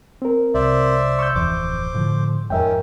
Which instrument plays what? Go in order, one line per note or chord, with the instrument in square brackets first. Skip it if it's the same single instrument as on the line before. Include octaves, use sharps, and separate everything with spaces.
[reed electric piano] C4 A#4
[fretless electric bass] C2 [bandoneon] C5 D5 E5
[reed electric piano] C#6 E6 G6
[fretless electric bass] D1 F2 E3 [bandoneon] C5 D6
[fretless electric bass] A2 D3 F3
[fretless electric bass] F2 G#2 [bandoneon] D#3 C#4 [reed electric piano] A#4 E5 G5